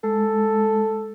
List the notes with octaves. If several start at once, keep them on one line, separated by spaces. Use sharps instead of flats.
G#3 A4